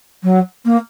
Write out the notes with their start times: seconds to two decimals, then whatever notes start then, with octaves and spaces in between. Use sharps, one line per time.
0.23 F#3
0.65 A#3